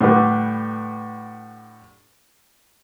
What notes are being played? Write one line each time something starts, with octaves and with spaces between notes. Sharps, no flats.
A2 D3 G3 B4